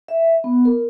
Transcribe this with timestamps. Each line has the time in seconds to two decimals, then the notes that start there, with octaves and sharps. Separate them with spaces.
0.08 E5
0.44 B3
0.65 A#4